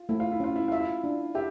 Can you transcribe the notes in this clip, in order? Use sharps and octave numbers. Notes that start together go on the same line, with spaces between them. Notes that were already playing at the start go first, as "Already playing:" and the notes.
Already playing: F4
A3 E4
F4
E4
C#4 F4
E4
F4 E5
E4
D4
G4 E5